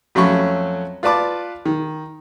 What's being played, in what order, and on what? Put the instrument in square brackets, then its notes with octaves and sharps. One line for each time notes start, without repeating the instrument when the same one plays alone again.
[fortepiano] F2 F#3 A3 C#4 B5 C#6
F4 B4 D5 A5 D6
D#3